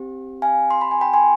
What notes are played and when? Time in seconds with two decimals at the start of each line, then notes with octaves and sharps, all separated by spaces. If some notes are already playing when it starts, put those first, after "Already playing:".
Already playing: C4 G4
0.42 F5 G#5
0.71 C6
0.81 B5
0.91 G#5
1.01 G5 B5
1.14 G#5 C6